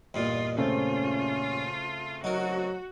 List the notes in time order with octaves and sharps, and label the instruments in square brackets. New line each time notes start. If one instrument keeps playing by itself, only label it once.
[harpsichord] E2 G2 A#2 [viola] F4 [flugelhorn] D#5
[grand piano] C#3 A3 C4 [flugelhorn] C#4 [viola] F4
[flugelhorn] F#3 [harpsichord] D#4 A#4 [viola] F#4